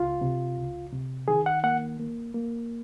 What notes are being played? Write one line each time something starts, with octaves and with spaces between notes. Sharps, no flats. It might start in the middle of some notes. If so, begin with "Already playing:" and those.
Already playing: C#2 F4
C3
C#2
C3
D#3 G#4
F#5
A#3 F#5
A#3
A#3